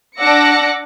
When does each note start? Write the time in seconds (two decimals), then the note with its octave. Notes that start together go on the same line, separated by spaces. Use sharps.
0.19 D4 F#5 D6 E6 A#6 C#7